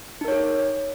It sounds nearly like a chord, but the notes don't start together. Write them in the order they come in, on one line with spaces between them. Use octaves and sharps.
D#4 A#4 C#5 G#4